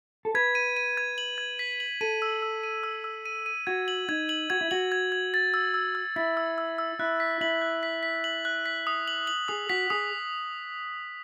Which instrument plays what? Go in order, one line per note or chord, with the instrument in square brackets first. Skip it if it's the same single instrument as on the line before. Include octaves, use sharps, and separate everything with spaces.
[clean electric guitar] A4
[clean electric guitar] B4 [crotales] G#6
[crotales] D#7
D#7
G#6
F#7
G#6
B6
F#7
[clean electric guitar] A4 [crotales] D#7
[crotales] E6
E6
D#7
E6
E6
D#7
D#7
[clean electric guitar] F#4 [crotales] G#6
[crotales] F#7
[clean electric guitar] D#4 [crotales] G#6
[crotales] F#7
[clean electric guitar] F#4 [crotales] G#6
[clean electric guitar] E4
[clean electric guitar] F#4 [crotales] F#7
[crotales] G#6
G#6
A6
E6
E6
E6
[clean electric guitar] E4 [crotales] A6
[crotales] E6
E6
E6
[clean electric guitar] E4 [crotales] F#6
[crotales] B6
[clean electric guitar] E4 [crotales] F#7
[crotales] F#6
B6
B6
F#7
F#6
B6
D#6
F#7
F#7
[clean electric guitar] G#4 [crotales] D#6
[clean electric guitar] F#4 [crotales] B6
[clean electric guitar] G#4 [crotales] D#6